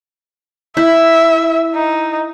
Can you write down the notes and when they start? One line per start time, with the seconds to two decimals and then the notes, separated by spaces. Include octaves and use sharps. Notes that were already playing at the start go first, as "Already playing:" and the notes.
0.77 E4 E5
1.75 D#4